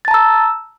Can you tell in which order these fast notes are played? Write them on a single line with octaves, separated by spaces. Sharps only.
A6 A5 A#5 E6